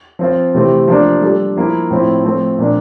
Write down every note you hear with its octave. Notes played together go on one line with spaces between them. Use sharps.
F3 C4 F4
C3 E3 A3 C4 G4
F3 A#3 D4
G3 D4 A4
F3 A#3 E4
A2 F3 C4 E4
F3 A3 C4
A#2 F3 A#3 D4